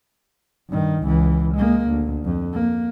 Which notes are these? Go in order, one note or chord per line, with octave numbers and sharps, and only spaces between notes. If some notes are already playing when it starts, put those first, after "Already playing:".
G2 D#3
C#2 E3
G#3 A#3
D2
F2
A#3